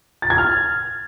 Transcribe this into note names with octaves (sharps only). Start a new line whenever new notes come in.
A6
G#6
F6